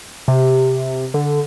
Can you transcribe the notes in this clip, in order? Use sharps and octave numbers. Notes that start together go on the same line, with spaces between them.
C3
D3